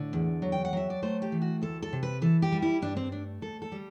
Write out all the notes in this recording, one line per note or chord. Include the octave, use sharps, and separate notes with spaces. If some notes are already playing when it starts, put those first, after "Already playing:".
Already playing: A2 D3 D5
E2
F#3
G5
F#5
F#3 E5
D5
A3 C5
G4
E3
F#4
D2 A4
A4
C3
B4
E3 A4
G4
G3
E4
G2 D4
C4
A3 D4
D2 A4
A4
G3